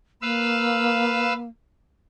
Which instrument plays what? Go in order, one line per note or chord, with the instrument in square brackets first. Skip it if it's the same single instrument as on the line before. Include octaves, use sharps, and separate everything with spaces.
[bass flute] A#3 [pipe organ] B4 F5 E6